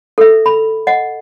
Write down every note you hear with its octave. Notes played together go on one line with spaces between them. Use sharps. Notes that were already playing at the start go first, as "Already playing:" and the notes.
A4 E5
B5
D#5 F#5